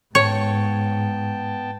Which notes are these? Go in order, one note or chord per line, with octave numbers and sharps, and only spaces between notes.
G#2 B3 C#5 G5 A5